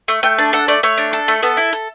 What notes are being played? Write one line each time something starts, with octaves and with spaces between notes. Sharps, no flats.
A3
A3 G5
D4 A5
A4 F#5
A3 D5
A3 C#5
D4
A4
A3
B3 A4
E4
A4